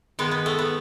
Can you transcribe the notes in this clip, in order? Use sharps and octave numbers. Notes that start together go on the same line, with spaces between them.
D#3 G#3 B3
B3
A3
B3